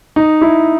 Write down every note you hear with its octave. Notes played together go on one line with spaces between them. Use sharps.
D#4
E4